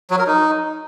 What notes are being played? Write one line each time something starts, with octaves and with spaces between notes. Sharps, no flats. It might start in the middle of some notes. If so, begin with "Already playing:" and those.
F#3
A#4
D#4